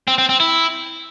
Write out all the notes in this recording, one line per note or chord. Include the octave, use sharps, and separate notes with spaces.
C4
C4
C4
E4